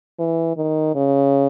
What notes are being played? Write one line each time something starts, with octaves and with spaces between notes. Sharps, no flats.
E3
D#3
C#3